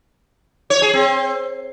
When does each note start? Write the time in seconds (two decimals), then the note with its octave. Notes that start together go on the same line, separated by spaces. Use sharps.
0.70 C#5
0.82 G#4
0.94 C4